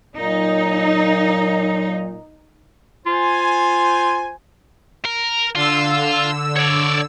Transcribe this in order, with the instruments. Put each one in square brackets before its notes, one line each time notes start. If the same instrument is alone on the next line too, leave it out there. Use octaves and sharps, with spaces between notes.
[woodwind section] A#2 F#3 [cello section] D#4
[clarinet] F4 [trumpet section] C5 G#5
[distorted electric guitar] A#4
[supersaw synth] D3 E6 [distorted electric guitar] F4
[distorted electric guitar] C#5 D5